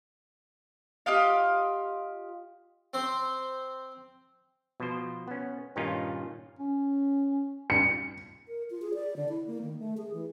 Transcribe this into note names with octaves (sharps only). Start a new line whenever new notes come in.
F4 G4 D#5 F5
C4 C5
B2 F3 C5
B3 C#4
G2 A#2 D#3 C#4 D#4 F4
C#4
C#7
A#4
F4
G#4
D5
D3
E4
A#3
D#3
A3
G#4
E3